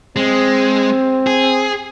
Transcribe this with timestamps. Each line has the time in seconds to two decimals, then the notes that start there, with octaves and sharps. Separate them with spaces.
0.16 G#3 C4
1.27 G#4